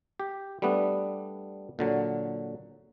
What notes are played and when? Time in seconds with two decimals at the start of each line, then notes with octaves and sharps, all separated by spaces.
0.20 G4
0.62 G3 A3 B3 D4
1.79 A#2 D3 F#3